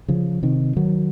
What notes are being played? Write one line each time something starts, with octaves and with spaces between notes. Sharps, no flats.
C#3 F3
C3 D#3
D#3 F#3